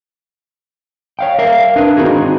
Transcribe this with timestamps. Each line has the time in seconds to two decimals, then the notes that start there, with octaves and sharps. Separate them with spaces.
1.19 C#5 F5 G5
1.39 A#4 E5 F5
1.76 D4 A#4 B4
1.97 C4 D#4 F#4 G#4